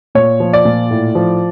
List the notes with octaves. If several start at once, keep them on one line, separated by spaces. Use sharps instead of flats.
A#2 C#5
F3
D5
A#2
A2
F3